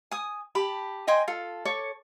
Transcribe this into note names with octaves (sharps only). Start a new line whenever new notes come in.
G#5 D#6
G4 A5 B5
D#5 G5 G#5 C6
F4 A4
A4 C#5 C#6 D6